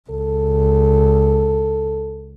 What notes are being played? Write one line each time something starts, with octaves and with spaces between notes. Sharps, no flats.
C#2 A4